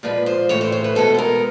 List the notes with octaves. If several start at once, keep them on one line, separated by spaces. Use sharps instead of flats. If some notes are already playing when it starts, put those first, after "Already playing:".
A#2 F3 G#3 B4
C5
A2 E3 A3 C#5
C5
C5
B4
B2 G#3 B3 A4
A4
A#4